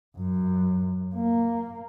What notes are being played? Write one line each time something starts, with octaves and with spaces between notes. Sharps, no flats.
F#2
A#3